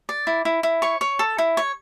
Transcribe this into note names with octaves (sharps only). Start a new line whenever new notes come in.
D5
E4
E4
E4
C#5 C#6
C#5
A4
E4
C#5